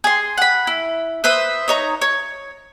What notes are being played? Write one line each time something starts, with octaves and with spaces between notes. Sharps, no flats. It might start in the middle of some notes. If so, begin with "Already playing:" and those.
G#4 C6
F#5 B5
E4
B4 C5 E5 D#6
D#4 C#5 A#5
C#5